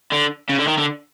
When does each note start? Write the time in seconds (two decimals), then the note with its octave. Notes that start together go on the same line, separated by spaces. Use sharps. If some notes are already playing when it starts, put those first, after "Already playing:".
0.12 D3
0.49 C#3
0.59 D3
0.67 D#3
0.78 D3